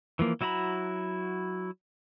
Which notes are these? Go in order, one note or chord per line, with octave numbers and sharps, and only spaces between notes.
E3 F3 A#3
F#3 E4 F#4 A#5 B5